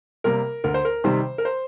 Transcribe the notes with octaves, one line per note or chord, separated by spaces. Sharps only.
C3 G3 A#3 A#4
D2 A#4
C5
A#4
C3 D#3 G3 C5
A#4
C5